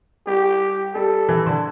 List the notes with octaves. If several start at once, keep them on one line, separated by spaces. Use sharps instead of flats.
G3 G4
G3 A4
E3
D3